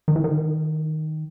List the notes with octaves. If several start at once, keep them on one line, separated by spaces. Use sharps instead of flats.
D#3
E3
D#3